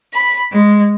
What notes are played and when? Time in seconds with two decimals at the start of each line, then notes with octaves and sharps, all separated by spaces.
0.13 B5
0.53 G#3